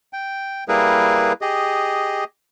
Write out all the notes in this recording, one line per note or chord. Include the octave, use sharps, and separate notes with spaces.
G5
G3 A#3 E4 G#4 A#4 B4
G4 G#4 D#5